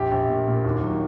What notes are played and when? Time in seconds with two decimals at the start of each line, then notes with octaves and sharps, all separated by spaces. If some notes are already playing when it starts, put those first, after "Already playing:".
Already playing: A#1 G4
0.11 A#1
0.29 A#2
0.47 A#2
0.65 D#2 F#4
0.83 F#3